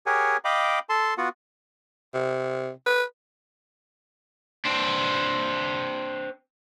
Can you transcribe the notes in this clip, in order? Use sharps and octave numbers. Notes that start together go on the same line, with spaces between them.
G4 G#4 A#4 C#5 F#5 G#5
D#5 F5 G5 B5 D6
A4 A5 C6
B3 F4 F#4 F#5
C3
B4
C4 D4